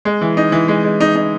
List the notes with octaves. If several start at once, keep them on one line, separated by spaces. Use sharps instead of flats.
G#3
E3
D#4
E3
G#3
G#3
D#4
D#4